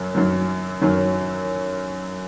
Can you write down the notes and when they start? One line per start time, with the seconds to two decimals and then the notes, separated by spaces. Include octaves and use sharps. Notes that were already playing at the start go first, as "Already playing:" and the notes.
Already playing: F#2 F#3
0.15 F#2 D#3 F#3
0.81 F#2 D#3 F#3